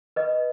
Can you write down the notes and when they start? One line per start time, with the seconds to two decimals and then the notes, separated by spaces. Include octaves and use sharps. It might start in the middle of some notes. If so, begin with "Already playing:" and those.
0.16 B4 D#5